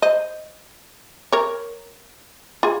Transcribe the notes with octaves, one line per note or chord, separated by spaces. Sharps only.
C5 D#5
A#4 C#5
F4 G#4